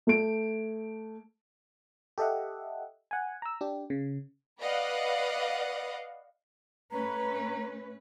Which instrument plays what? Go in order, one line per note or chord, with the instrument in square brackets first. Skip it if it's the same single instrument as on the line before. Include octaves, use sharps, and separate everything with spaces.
[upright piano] A3 D7
[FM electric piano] G4 A4 D#5 E5 F#5
F#5 G#5
A#5 E6
D4 G4
C#3
[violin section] B4 D5 D#5 F5 F#5
[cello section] A3 C#4 B4 [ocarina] A#5